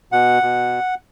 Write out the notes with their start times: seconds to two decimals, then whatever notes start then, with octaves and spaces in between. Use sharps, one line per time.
0.12 B2 F#5
0.43 B2